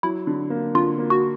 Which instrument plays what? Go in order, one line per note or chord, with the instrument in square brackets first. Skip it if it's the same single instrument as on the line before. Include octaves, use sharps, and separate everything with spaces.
[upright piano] F#3 [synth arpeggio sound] E4
[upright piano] D3
A#3
[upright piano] D3 [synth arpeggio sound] F4
[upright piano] A#3
[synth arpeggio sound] F#4